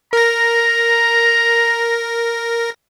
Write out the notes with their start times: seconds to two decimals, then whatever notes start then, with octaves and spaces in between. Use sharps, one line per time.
0.13 A#4 A#5 A#6